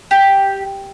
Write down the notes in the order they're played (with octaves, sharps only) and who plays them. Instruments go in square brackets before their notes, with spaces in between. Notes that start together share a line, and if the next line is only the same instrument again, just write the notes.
[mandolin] G4